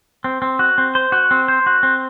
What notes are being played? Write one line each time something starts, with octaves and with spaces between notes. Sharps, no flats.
C4
C4
F#4
C4
C5
F#4
C4
C5
F#4
C4